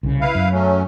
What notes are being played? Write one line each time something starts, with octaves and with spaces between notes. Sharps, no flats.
C2 C#3
E4 B4 F5
F#2
F#3 A3 C#4